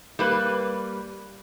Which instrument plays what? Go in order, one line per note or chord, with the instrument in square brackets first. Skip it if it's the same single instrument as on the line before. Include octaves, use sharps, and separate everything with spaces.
[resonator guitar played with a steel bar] G3 A#3 B4